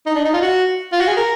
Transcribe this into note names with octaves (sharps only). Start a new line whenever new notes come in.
D#4
D4
D#4
F4
F#4
F4
F#4
G#4
A#4